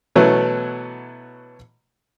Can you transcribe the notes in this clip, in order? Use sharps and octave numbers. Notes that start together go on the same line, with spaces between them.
B2 E3 F#3 A3 B3 C#4